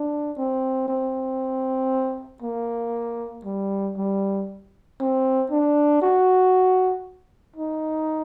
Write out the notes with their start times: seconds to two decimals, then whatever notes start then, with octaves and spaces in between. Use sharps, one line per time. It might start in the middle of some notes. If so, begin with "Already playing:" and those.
Already playing: D4
0.37 C4
0.88 C4
2.42 A#3
3.45 G3
3.97 G3
5.00 C4
5.51 D4
6.02 F#4
7.56 D#4